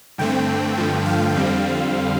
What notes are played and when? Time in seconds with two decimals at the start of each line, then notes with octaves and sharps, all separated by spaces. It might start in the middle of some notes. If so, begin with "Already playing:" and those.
0.18 G2 D3 A3 C4 G5
0.77 G2 D3 F3 A3
1.06 F5
1.35 F2 D3 G3 C4